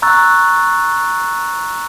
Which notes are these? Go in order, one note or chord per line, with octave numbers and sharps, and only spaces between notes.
A#5 C#6 E6 F#6 A6